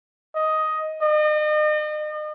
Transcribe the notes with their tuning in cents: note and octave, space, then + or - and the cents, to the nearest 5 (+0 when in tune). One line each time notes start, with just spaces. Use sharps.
D#5 +10
D#5 -40